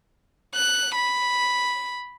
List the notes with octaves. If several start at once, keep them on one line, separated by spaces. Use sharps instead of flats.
F#6
B5